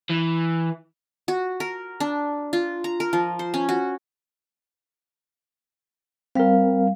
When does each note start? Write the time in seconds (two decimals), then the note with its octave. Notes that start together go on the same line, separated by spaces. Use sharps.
0.09 E3
1.28 F#4
1.60 A#4
2.00 D4
2.53 F4
2.84 A#5
3.00 A#4
3.13 F3
3.39 C5
3.54 C#4
3.69 F#4
6.35 G3 C4 A#4 F5